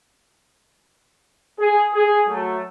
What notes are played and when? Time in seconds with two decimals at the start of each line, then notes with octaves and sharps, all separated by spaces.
1.59 G#4
1.93 G#4
2.28 F#3 A3